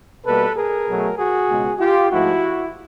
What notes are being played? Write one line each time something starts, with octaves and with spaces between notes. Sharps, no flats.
B2 G3 A#3 A4 B4
G#4 A#4
B2 F#3 A3
F#4 G#4
C#2 B2 G#3 B3
F4 G4
G#2 F3 A3 E4 F#4